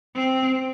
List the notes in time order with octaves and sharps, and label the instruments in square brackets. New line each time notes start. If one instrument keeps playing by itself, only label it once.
[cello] C4